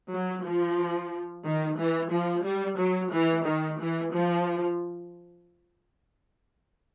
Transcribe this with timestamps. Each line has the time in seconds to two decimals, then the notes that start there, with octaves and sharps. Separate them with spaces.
0.11 F#3
0.45 F3
1.46 D#3
1.79 E3
2.12 F3
2.46 G3
2.79 F#3
3.14 E3
3.47 D#3
3.81 E3
4.15 F3